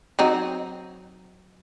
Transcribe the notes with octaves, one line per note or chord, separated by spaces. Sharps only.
F#3 C4 D#4